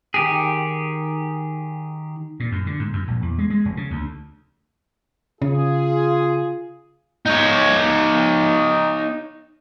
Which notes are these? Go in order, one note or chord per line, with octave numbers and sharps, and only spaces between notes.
D#3 G4 G#4
A#2
F#2
D3
G#2
F#2
A#1
E2
G#3
G#3
F1
C#3
D2
C#3 F4 G#4
D#4 C#5